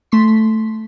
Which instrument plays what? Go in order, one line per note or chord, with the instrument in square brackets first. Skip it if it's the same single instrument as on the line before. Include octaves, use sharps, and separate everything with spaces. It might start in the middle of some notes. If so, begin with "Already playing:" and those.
[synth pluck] A3 C6 B6